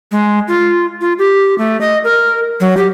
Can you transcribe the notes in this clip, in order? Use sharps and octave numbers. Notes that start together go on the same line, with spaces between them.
G#3
F4
F4
G4
A3
D#5
A#4
F#3
G4